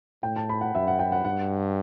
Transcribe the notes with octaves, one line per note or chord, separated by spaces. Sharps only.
A2 G5
A5
B5
F#5
F#2 E5
F#5
G5
F#5
G2 F#5